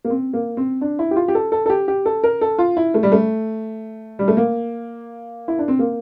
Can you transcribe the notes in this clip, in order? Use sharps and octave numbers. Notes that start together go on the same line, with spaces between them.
A#3
C4
A#3
C4
D4
E4
G4
F4
G4
A4
A4
A4
G4
G4
A4
A#4
A4
F4
E4
A3
G3
A3
G3
A3
A#3
E4
D4
C4
A#3